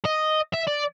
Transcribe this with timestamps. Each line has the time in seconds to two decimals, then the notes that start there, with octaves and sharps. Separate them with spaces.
0.05 D#5
0.53 E5
0.67 D5